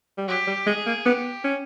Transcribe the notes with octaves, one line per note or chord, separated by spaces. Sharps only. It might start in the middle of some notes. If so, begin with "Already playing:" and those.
G3
F#3 G4
G3
G#3 G#4
A#3
B3 G4
C#4